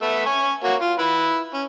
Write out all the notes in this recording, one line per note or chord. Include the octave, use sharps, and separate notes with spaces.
A3 B3 E5
G#5 C#6
A#3 F#4 C#5
F4
E4 B4
C#4